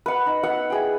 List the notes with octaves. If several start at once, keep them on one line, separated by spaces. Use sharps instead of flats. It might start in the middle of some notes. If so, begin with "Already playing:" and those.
B4 F#5
D#4
B3 F#5 E6
E4 G#4 G5